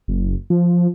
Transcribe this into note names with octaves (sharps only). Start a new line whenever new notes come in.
F#1
F3